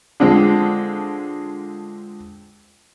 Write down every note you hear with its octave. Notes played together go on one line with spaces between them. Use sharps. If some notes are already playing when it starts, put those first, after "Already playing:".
D3 F3 G#3 C4